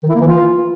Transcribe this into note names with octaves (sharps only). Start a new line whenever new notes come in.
D#3
E4
A#3
E3
F4